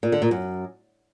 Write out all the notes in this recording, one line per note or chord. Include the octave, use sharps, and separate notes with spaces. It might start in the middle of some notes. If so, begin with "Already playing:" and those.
A#2
D3
A#2
F#2